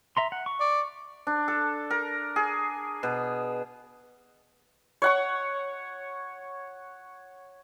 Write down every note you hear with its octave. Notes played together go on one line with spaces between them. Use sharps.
E5 A#5 C6
F#5
C#6
D5
D4
A4
A#4
G#4
B2
C#5 F#5 C#6